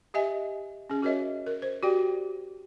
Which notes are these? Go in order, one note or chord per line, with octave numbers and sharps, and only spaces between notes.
G4 D#5 E5 G#5
C#4 G#4
F#4 G#4 A#4 C#5 D#5 E5
A#4
C5
F#4 G4 D5 G5